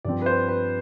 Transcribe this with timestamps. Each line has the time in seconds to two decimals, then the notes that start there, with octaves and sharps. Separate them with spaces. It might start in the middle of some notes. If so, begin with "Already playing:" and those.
0.05 G2 F3 C4 D5
0.22 B4
0.26 C5
0.49 B4